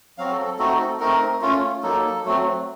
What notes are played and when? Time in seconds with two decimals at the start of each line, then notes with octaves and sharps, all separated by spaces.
0.18 F#3 C4 F#4 F5
0.32 A4
0.45 A4
0.59 A3 C4 D#4 F#4 A4
0.79 A4
1.00 A3 C4 D#4 A#4
1.42 A3 C#4 F4
1.83 F#3 A#3 D#4 A4
2.24 F#3 A3 C4